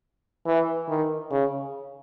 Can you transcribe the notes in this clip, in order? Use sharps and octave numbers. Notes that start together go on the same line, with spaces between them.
E3
D#3
C#3